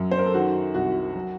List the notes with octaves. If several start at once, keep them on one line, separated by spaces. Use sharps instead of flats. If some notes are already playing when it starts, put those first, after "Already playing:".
Already playing: F#2 F#3
C5
A#4
A4
D#3 F#4
C2 F#4
F#3